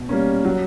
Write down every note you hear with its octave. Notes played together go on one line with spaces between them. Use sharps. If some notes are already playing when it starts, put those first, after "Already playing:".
Already playing: B2
G3 A#3 C#4
F#3